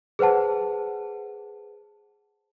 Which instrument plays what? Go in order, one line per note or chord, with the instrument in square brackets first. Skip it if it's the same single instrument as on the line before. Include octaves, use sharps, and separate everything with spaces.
[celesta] G#4 B4 C5 F#5 A5